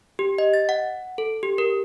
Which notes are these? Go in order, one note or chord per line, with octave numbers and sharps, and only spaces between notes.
G4
D#5
A6
F#5
A4
G4
A#4